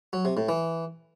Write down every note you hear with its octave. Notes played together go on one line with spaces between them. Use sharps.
F#3
C3
A2
E3